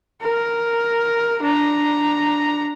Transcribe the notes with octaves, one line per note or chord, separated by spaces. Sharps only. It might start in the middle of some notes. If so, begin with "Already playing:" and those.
A#4
D4 A#5